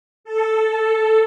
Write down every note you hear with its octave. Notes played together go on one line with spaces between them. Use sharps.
A4